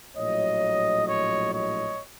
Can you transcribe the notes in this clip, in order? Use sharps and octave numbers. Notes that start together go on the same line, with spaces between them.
A#1 A2 F#3 C#5 D#5
C#5 D#5
C#5 D#5